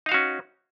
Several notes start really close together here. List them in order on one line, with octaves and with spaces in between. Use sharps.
D#4 F5 F#4 C#4